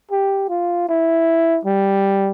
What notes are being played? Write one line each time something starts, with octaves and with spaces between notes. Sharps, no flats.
G4
F4
E4
G3